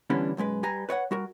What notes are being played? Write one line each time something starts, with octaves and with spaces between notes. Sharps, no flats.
D3 E3 G3 B3 C#4 D4
B1 F#2 G#3 B4
G3 B4 G#5 A#5
B4 C#5 D5 F#5
G3 F#4 A#4